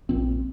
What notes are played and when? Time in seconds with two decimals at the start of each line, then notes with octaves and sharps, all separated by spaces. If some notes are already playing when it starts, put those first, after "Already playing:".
0.09 A#1 A#2 C4